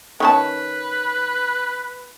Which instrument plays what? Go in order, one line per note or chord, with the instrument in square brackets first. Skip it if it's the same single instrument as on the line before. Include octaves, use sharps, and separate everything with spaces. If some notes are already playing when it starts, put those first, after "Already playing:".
[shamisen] D#3 C#4 A5 [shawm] B4